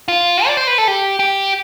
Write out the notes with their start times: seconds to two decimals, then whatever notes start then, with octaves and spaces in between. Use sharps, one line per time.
0.08 F4
0.46 D5
0.57 C5
0.67 B4
0.78 A4
0.88 G4
1.19 G4